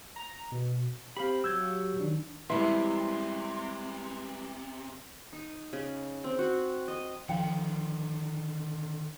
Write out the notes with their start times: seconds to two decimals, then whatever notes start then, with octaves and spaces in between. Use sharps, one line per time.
0.16 A#5
0.52 B2
1.17 C4 G4 C5 F5 B5
1.44 F#3 E6 G6 G#6
2.00 D#3 D4
2.50 C3 E3 G3 G#3 E4 E5 C6
5.33 D#4
5.73 C#3
6.24 C4
6.39 F#4
6.88 D#5
7.29 D3 D#3 F3 F5 G5